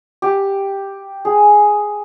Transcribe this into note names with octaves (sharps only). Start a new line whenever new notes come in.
G4
G#4